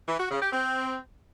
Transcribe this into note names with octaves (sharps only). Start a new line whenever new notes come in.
E3
F#4
C#3
G4
C4